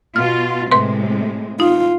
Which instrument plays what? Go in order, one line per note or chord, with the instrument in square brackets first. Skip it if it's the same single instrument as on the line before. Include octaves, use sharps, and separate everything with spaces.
[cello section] B2 F4 F#4 [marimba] F6
[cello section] A2 C3 G#3 [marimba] B4 C6
[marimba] D#4 [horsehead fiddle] F4